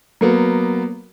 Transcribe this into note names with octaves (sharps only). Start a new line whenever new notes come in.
F#3 A#3 B3